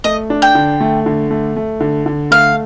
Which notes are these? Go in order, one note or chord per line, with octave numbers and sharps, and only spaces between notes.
A3 D#5
D4
G5
D3
A3
D3
A3
A3
D3
D3
A3 F5